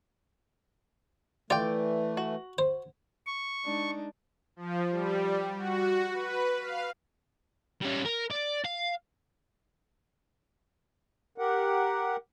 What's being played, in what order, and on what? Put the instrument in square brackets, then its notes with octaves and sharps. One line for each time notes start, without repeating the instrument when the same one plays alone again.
[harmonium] E3 A3 [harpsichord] F4 [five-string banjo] D5 G5
[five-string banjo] F#4
[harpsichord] C5
[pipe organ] C#6
[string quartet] G#3 D4 D#4
[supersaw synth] F3
G3
F#4
B4
F5
[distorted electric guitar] G3 C#4
A#4
D5
F5
[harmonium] G4 A#4 F#5